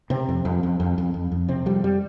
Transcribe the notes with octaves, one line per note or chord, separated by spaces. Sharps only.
C3 C4
F2
F2
F2
F2
F2
F2
F2
C3 C4
F2 G3
G3